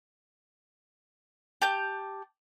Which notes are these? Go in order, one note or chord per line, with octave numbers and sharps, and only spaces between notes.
G4 A5 G6